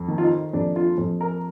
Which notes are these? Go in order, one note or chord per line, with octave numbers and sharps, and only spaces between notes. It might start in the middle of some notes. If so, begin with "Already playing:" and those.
Already playing: F2
D#3
F4
D#4
F2 D4
F4
F2
A#4